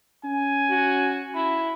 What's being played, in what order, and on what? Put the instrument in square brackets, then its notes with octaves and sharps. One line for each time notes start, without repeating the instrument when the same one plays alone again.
[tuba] C#4 [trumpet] G#5
[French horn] F#4
[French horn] E4 [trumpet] B5